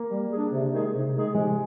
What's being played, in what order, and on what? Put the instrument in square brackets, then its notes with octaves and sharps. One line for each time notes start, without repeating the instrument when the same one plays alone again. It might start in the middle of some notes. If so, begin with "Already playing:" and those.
Already playing: [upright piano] A#3
[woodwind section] G3
D4 G#4
C3
D#3 G#3 D#4 G#4
C3
D#3 G#3 D#4 G#4
[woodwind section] C3 [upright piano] G#3